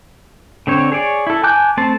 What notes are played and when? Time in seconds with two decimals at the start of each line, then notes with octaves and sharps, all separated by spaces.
0.67 D3 C4 C#5
0.92 G#4 C#5 D5
1.27 E4 A4
1.44 G#5 A5 D6 F#6 G6
1.77 A3 C4 C5 A5